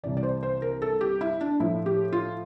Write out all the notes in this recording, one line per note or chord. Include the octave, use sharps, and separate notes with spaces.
C2 C3 E3 D5
D5
C5
C5
A#4
A4
G4
E4
D4
A2 F3 E4
G4
F4